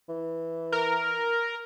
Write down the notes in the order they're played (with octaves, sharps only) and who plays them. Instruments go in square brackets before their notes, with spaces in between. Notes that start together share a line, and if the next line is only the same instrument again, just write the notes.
[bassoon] E3
[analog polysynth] A#4